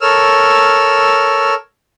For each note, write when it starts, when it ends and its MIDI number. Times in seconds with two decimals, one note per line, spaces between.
0.01 1.54 69
0.01 1.54 70
0.01 1.54 73
0.01 1.54 88
0.01 1.54 89